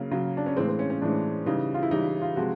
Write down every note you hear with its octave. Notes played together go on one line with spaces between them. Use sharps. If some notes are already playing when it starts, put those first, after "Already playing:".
Already playing: C#3 F#3 A#3
C#3 F#3
D4
C#4
A2 E3 G#3 C4
C4
C#4
C#4
A2 E3 G#3 D4
C#3 E3 G3 D#4
F4
E4
C#3 E3 G3 D#4
E4
F4
C3 F3 G#3 F#4